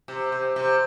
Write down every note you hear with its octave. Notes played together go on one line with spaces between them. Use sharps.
C3
C3
C3